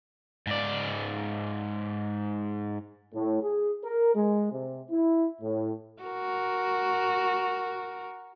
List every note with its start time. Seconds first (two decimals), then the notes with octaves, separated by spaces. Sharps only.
0.47 G#2 D5
3.14 A2
3.42 G#4
3.84 A#4
4.15 G#3
4.52 C3
4.91 E4
5.41 A2
6.02 F#4 A#4